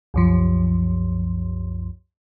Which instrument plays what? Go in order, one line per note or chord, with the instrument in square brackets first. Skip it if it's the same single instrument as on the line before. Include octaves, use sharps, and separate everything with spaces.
[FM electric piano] C2 F#2 F3